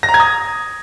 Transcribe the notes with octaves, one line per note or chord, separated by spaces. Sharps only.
A#6
A#5
G#6
D#6